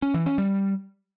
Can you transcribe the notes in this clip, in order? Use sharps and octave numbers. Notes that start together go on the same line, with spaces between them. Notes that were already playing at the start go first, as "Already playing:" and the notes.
C#4
E3
C#4
G3